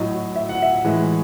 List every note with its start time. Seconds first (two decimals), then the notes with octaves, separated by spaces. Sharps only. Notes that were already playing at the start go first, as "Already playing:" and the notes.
Already playing: A2 F#3 D#5
0.36 E5
0.49 F#5
0.62 E5
0.84 A2 E3 G#3